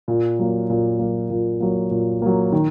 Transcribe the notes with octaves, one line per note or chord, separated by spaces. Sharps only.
A#2
F#3 A#3
A#2
F#3 A#3
A#2
F#3 A#3
A#2
F#3 A#3
D#3